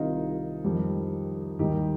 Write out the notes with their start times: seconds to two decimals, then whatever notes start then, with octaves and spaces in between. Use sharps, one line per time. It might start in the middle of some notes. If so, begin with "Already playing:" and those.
Already playing: C2 C3 D#3 D#4 F4
0.64 F2 D#3 G3
1.59 D#2 D#3 G3 D#4 G4